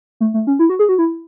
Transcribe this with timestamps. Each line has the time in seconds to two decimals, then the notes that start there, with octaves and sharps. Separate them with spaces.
0.20 A3
0.34 A3
0.47 C#4
0.59 E4
0.69 F#4
0.79 G#4
0.89 F#4
0.98 E4